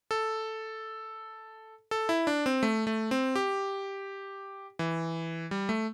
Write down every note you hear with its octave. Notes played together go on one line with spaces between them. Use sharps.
A4
A4
E4
D4
C4
A3
A3
C4
G4
E3
G3
A3